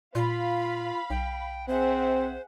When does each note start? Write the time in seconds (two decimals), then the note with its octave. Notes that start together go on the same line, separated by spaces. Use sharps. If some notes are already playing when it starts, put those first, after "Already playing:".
0.15 A#2 F4 F5 B5
1.10 B1 G5
1.68 C4 G#4 C5 E5 F#5